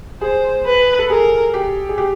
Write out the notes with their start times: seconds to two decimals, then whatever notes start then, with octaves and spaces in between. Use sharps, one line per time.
0.21 G#4 C5
0.65 B4
0.99 A4
1.10 G#4 A#4
1.54 G4
1.89 G#4
1.98 G4